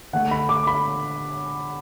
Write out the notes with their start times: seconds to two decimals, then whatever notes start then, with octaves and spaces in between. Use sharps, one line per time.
0.13 D3 A3 D4 F#5
0.31 B5
0.49 D6
0.67 B5